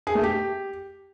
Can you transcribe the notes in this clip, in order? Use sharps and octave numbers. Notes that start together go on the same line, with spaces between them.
G#4
A3
G4